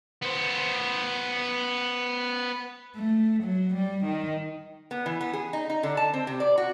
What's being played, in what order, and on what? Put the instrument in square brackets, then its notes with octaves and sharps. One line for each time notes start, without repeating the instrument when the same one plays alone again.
[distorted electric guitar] B3 C5
[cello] A3
F#3
G3
D#3
[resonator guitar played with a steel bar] B3
E3
B3
G#4
D#4
D#4
D3
A5
C4
C3
D5
F#4